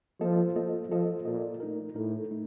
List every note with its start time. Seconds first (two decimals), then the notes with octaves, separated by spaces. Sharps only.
0.21 F3 A#3 F4 A4 D#5
0.56 A#3 F4 A4 D#5
0.90 F3 A#3 F4 A4 D#5
1.25 A#2 A#3 F4 A4 D#5
1.60 A3 D#4 A#4
1.96 A2 A3 D#4 A#4
2.31 A3 D#4